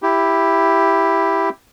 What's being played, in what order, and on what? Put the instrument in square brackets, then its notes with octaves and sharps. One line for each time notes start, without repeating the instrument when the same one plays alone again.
[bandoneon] E4 G4